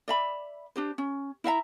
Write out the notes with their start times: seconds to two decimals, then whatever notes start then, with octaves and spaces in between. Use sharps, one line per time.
0.08 D5 E5 B5
0.76 D4 G4 C5
0.98 C#4
1.44 E4 E5 F5 A#5